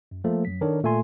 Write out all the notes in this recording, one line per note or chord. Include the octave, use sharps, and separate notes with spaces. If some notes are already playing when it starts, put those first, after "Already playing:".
F#2
F3 A3 A#3 A4
F#2 F#3 B6
D#3 D4 A4 A#4 C#5
A#2 A3 A4 G#5 C6